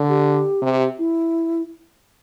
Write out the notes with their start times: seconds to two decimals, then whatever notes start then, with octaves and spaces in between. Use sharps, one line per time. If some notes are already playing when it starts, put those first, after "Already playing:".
Already playing: D3
0.09 G4
0.62 C3
0.99 E4